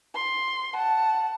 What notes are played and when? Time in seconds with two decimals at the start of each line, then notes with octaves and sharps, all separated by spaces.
0.15 C6
0.74 F#5 A5